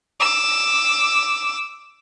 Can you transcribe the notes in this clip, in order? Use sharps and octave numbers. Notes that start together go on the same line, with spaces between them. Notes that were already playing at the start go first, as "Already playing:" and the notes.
D6 E6